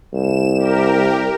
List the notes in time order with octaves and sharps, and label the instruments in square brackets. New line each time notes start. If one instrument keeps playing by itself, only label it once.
[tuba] C2 [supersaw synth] E7
[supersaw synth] G4 A#4